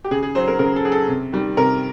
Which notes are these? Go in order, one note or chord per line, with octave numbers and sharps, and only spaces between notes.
G4
C#3 G#4
G#4
F#3 C5
A#4
C#3 A#4
A4
F#3 G#4
A4
C3
D#3 G3
C3 A#4